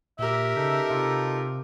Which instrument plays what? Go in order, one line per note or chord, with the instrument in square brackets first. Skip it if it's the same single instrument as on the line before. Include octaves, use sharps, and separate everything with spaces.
[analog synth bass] A#2 [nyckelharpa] G4 A#4 [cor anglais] E5
[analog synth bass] C#3 [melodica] D#4 A4
[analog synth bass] C3 [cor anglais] F4